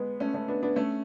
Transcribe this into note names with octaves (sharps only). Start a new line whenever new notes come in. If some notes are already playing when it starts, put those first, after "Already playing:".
Already playing: G#3 B3
A3 C#4
A3 C#4
B3 D4
B3 D4
A3 C#4